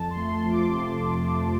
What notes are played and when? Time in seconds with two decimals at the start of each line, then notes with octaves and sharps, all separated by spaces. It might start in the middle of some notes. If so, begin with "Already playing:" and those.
Already playing: F2 A5
0.10 C6
0.16 A3
0.30 C6
0.43 F3
0.50 D6
0.68 C3 C6
0.94 F2
1.21 A3